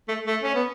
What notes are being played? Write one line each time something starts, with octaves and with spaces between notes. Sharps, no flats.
A3
A3
C#4
B3